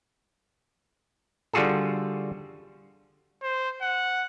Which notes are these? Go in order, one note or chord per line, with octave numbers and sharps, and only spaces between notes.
D3 G3 F4 F#4 G#4 A4
C5
F#5